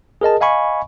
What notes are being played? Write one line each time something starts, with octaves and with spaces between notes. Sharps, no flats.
G#4 A#4 D#5 A5
D#5 F5 G#5 B5 C#6